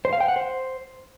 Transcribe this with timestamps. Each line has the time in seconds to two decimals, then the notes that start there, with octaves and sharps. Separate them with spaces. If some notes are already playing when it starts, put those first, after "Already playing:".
0.05 C5
0.13 F5
0.20 G5
0.28 F#5
0.36 C5